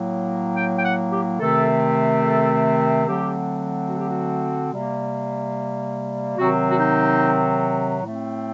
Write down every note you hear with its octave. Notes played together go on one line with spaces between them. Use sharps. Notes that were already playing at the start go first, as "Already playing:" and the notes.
Already playing: A2 F#3 A#3
G5
G5
F#5
G4
C3 D#3 A3 C4 A4
A4
D3 F#3 A3 C4 G4
F#4
G4
F#4
C3 G3 A#3
C3 D#3 F#3 C4 F#4
F#4
D#4
A2 A3 C4